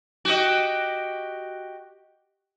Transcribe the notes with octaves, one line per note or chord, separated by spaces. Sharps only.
F#4 G4 D#5